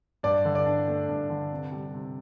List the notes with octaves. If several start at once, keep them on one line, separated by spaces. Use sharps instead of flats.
G2 D5
D3
D5
D4
A3
G2
D3
C3
G3
C3